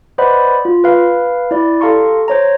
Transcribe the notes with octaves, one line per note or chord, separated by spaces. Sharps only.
B4 C5 D5 D#5 F#5 B5
F4
B4 F5
E4 D5
G4 A4 F5 A#5 C6 C#6
C5 C#5 A#5